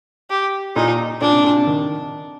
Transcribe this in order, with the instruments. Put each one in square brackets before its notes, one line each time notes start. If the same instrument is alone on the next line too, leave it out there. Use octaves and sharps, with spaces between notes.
[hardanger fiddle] G4
[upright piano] A#2 [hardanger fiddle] D#4
[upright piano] A#2 [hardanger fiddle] D4
[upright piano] C3
A#2
C3
D#3